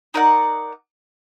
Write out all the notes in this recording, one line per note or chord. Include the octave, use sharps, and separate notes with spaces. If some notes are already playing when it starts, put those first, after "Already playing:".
D#4 A#4 D5 F#5